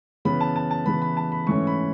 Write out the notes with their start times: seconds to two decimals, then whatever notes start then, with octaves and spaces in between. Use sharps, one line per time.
0.25 C#3 E3 B3 B5
0.40 A5
0.56 A5
0.71 A5
0.86 C#3 E3 B3 B5
1.02 B5
1.17 A5
1.32 B5
1.47 G#2 E3 A3 C#4 C#6
1.67 B5